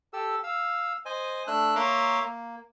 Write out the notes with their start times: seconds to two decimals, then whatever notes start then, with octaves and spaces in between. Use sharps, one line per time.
0.13 G4 A4 E6
0.43 F5 E6
1.05 C5 D#5 G#5
1.47 A3 D4 E6 F#6
1.76 A#3 C#5 E5 A#5 C6 D6
2.22 A#3